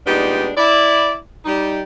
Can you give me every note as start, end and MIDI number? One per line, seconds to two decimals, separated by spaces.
0.06 0.50 46
0.06 0.50 55
0.06 0.50 56
0.06 0.50 59
0.06 0.50 62
0.06 0.50 63
0.57 1.16 64
0.57 1.16 74
1.45 1.82 55
1.45 1.82 63